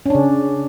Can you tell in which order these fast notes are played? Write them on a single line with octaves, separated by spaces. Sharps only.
C#4 D4 C#3